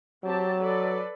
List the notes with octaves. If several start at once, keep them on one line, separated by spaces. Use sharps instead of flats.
F#3 C4 G4 A5
A4 B4 D5